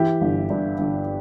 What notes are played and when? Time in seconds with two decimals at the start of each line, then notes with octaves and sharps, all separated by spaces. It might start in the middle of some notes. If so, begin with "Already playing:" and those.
Already playing: E3 E4 G4
0.21 G1
0.50 G2
0.79 G1